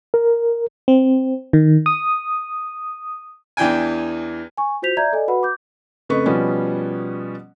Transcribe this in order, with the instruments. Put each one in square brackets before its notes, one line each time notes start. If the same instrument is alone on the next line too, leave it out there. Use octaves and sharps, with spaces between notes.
[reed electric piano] A#4
[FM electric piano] C4
D#3
D#6
[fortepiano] E2 E3 D4 G5 G#5
[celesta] G#5 C#6
F4 F#4 C5 G6 B6 F7
D5 E5 A#5 G6 G#6
A4 D5 D#5 G#5
F#4 B4 F#5 B5
D6 G6
[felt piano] F2 C#3 A3 B4 D#5 C#6
B2 F3 G3 B3 C#4